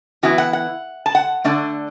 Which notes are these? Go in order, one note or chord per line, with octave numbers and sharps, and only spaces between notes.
E3 B3 E4 F#4
F#5
F#5
A5
F#5
D3 A3 D4